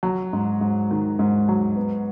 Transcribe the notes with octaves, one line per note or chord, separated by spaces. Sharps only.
F#3
G#2
G#2
D#3
G#2
F#3
B3